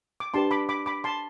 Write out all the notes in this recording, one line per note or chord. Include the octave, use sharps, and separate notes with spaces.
D6
D4 G4 B4 A5 C6
B5 D6
B5 D6
B5 D6
A5 C6